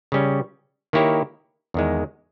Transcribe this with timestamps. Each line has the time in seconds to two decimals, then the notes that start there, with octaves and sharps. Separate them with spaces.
0.12 C#3 G3 C#4
0.93 D#3 A#3 E4 G4 C#5
1.74 E2 D#3 G#3